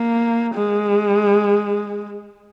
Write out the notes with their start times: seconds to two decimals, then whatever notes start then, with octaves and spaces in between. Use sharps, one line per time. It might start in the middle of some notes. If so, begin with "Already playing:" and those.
Already playing: A#3
0.55 G#3